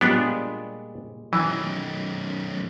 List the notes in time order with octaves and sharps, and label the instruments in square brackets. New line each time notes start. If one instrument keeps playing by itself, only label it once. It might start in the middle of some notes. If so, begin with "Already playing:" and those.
[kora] A#2 G3 G#3 [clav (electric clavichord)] B3 D4
[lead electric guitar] F#2 D#3 [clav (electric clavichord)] E3